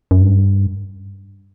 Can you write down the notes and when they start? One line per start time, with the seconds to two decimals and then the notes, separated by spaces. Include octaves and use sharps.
0.11 F#2
0.21 G2